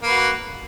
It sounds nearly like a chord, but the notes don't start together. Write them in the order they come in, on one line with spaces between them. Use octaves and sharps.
A#3 B4 F#4